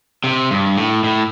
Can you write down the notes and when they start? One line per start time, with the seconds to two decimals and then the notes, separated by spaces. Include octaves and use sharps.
0.24 C3
0.51 G2
0.77 A2
1.04 A2